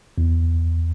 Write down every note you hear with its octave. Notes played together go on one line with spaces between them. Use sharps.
E2